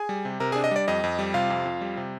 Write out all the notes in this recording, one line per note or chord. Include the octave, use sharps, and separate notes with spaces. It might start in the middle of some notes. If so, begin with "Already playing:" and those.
Already playing: G#4 G#5
G3
C3
C3 A#4 A#5
G#4 G#5
D4
D#5
G3 D5
F2 D#5
F2
G3
C3 F4 F5
F2
F2
G3
C3